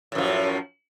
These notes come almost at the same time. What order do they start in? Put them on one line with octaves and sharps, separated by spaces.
A2 F#2 F3